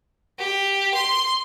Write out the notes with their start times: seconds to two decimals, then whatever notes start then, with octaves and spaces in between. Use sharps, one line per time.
0.39 G4
0.94 C6